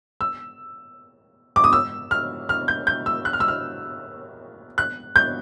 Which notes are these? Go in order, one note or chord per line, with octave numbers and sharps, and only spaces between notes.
E6
D6
D#6
E6
F6
F6
G6
G6
E6
F#6
F6
E6
F6
F#6
G6